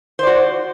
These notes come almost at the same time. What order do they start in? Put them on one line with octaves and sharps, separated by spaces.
C5 D5 F#4